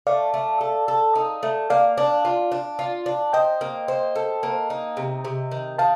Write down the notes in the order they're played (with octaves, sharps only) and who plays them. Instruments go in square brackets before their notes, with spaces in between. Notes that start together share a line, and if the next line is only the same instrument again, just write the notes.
[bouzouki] A3 [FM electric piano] D5 F5
[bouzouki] A3
A4
A4
D#4
A3
[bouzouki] A#3 [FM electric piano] D5 F5
[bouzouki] D4
F4
D4
F4
D4
[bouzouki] C5 [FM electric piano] D#5 G5
[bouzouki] A#3
C5
A4
A#3
D#4
C3
C3
D#3
[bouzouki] D#3 [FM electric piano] F5 A5